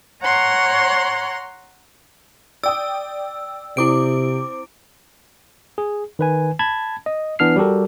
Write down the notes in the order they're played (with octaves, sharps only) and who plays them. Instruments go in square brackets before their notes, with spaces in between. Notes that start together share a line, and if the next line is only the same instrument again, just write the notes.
[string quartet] C#5 F#5 A#5 C6
[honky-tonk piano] D5 G5 D#6 [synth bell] E6
[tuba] C3 [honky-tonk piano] C4 [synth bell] E4 D6 D7
[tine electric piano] G#4
D#3 B4 G#5
A5 B5 G#6
D#5
E3 B3 D4 F6 C7
G3 F#4 G4 A4 A#4